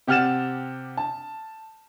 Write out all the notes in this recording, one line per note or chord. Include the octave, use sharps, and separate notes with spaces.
C3 G4 F#5 F6 A6 E7
A5